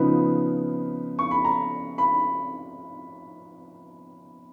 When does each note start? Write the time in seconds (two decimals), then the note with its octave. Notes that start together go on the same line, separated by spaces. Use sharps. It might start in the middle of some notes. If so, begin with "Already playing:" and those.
Already playing: C#3 F3 B3 D#4 B5
1.19 C#6
1.31 B5
1.45 A#5
1.98 B5